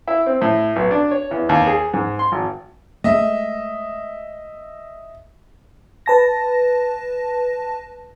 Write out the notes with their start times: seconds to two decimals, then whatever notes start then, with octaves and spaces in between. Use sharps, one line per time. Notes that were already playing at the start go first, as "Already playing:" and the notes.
0.08 E4
0.26 C4
0.41 A2
0.76 B1
0.91 D4
1.11 C#5
1.31 E2
1.49 D#2
1.67 G#4
1.94 G#2
2.19 C6
2.32 G#1
3.04 G#3 A3 D#5 E5
6.06 B4 A5 A#6